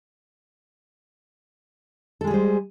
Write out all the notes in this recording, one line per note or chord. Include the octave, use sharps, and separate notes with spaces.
G3 G#3 G#4 A4 C5